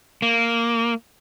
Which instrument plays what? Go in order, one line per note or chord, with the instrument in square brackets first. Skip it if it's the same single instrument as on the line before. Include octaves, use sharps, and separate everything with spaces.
[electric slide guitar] A#3